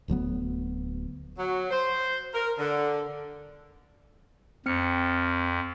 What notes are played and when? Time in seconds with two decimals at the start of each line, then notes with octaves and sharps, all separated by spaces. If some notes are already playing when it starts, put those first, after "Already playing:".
0.08 D1 D2 F#3 B3
1.38 F#3
1.71 C5
2.34 A#4
2.58 D3
4.66 F2 C4 F6 C#7